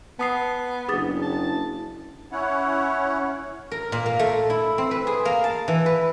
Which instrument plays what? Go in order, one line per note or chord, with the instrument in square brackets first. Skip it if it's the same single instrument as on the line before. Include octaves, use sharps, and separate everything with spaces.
[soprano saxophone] B3 [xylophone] A5 D#6 C7
[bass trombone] F#1 [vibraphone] D4 E4 [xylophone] G#4 D#6 A6
[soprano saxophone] A5
[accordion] C#4 E4 C#5 F#5
[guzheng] A#4
A#2
A#3
A3
E4
C4
B4
G#4
A#3
A5
E3
B4